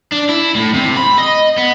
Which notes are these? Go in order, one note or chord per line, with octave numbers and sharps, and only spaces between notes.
D4
E4
A2
C3
B5
D#5
B3